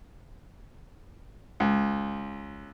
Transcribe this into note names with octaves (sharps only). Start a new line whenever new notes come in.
C#2